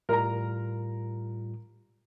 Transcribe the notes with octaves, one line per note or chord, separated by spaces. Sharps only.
A2 G3 F4 A#4 A#5